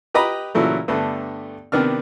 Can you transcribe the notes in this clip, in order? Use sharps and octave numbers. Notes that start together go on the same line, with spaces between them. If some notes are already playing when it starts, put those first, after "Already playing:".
G4 B4 D#5 A#5 B5 D6
A#2 C#3 E3 F#3 A3
G2 D3 A3 B3
C3 D#3 B3 D4 F6